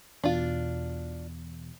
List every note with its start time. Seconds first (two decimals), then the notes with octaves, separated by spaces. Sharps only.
0.24 E2 B2 D4 F4